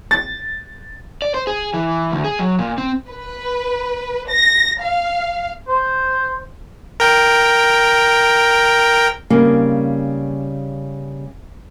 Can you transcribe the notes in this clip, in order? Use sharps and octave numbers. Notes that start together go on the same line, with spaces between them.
A6
D5
C5
G#4
E3
D2
G#4
F#3
A#2
C4
B4
A#6
F5
C5
A#4 G5
C#3 G3 A#3 C4 D#4